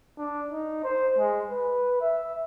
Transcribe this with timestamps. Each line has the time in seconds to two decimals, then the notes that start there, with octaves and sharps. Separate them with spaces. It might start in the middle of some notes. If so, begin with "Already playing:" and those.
0.18 D4
0.51 D#4
0.84 C5
1.18 G#3
1.49 B4
2.01 E5